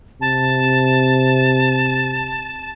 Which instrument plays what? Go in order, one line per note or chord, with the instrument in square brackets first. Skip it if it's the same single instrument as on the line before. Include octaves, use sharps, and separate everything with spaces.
[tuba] C3 [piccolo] A5